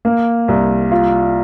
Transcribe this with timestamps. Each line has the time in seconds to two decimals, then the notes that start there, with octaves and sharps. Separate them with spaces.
0.05 A#3
0.48 C2
0.91 F4